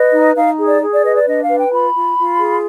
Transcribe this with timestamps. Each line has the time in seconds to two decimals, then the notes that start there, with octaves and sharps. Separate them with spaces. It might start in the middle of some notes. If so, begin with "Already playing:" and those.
Already playing: B4 D#5
0.11 D#4
0.35 D#4 F5
0.57 G#4
0.65 D5
0.81 G#4
0.91 D5
1.03 B4 D#5
1.14 D5
1.26 D4 D#5
1.41 F5
1.49 B4
1.57 G5
1.71 F4 B5
1.94 F4
2.17 F4
2.40 G#4